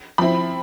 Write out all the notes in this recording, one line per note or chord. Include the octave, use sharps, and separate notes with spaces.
F3 C4 E4 B5